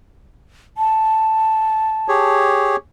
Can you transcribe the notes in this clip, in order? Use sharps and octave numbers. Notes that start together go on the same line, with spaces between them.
A5
G4 G#4 C#5